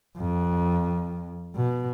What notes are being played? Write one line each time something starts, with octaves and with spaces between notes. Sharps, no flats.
F2
B2